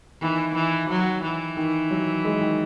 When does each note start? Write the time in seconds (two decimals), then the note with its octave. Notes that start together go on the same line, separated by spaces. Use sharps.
0.21 D#3 E3
0.55 E3
0.90 F#3
1.23 E3
1.57 D#3
1.91 F#3
2.25 G#3
2.41 D#3